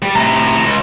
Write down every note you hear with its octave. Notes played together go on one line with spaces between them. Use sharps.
G3
A2 C3 A#5
C#2